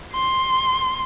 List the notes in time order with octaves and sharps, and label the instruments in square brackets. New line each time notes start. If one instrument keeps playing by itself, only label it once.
[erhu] C6